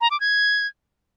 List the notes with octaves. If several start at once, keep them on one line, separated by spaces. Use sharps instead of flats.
A#5
D6
G#6